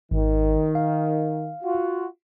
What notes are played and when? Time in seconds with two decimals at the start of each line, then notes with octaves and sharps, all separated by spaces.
0.11 G#1 D#3
0.75 F5
1.63 F4 F#4